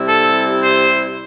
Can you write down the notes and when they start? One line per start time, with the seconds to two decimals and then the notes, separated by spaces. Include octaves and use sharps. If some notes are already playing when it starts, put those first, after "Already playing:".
Already playing: C3 G3 E4
0.08 A4
0.64 C5